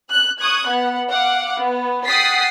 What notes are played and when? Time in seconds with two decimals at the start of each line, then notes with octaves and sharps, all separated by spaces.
0.11 F#6
0.40 C#6 D#6 F#6 G#6
0.70 B3 F#5
1.11 F5 F#5 D6
1.58 B3
2.07 F#5 G5 D#6 A6 B6 C7